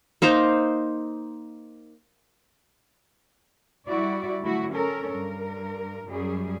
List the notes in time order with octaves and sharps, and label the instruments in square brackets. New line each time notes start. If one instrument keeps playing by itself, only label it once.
[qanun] A#3 D#4 C5 A#5
[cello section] G3 E4 F#4 D5
D3 F#3 A3 E4 F#4
C#4 A4 A#4
G2 A#4
F#2 F#3 G3 G#4